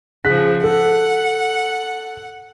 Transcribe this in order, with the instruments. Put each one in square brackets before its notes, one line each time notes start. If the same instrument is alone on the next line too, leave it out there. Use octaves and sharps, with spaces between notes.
[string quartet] C#3 F3 [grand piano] G#4 F#6 B6
[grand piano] A4 [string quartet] F#5